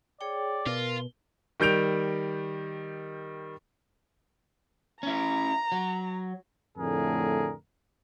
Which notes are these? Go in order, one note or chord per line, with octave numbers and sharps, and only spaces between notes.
G#4 C#5 D5 G5
B2 F4 A#4
D#3 G3 G6 D7 F7
C#4 E4 A#5
F#3
F2 A2 D3 A3 G#4 A#4